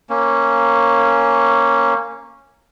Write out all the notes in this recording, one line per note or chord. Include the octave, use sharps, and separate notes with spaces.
A#3 C#4